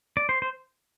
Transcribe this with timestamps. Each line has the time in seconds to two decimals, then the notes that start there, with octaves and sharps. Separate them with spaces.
0.17 D5
0.29 C5
0.42 C5